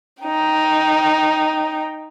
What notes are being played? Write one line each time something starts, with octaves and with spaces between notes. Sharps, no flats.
D#4 G5